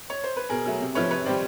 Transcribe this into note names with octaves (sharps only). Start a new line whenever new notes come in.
C#5
C5
B4
B2 G#4 A#4
F#3 A3
C3
F3 A3 B4 C#5
C3 B4 C#5
D#3 G3 C5 D5